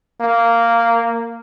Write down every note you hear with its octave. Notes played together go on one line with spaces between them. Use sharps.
A#3